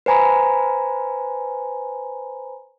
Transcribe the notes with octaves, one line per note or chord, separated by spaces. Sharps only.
B4 C5 G#5 A#5 B5